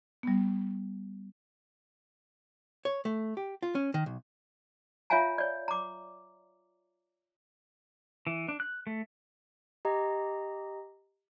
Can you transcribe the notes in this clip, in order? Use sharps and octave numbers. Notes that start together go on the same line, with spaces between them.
G3 B3
C#5
A3
G4
F4
C#4
D#3
B1
F4 C#5 E5 F5 G#5 A#5
C#5 D5
A#5 D6
E3
D4
F#6
A3
G4 D#5 A#5